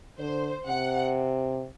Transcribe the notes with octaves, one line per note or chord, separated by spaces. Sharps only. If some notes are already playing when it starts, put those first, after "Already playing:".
D3 C5
C3 F#5